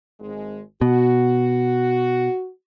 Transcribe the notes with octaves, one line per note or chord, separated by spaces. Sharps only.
G#1 G#3
B2 F#4